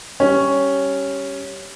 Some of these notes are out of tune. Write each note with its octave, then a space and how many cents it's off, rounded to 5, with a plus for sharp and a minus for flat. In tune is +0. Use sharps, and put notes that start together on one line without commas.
G3 -5 C#4 +0